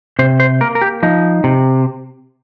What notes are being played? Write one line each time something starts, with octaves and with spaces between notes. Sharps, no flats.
C3 C5
C5
A#3 A#4
A#4
G4
F3 D#4
C3